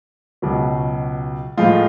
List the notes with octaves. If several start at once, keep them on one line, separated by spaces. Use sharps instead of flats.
C#2 B2 F#3
A2 F3 G#3 F4